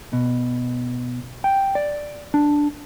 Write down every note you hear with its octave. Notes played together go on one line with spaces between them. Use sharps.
B2
G5
D5
D4